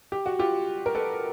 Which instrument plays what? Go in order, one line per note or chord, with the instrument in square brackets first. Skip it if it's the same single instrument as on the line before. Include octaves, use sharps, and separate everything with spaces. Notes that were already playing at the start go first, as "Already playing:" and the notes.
[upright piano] G4
F#4
F4 G4
A#4
A4 B4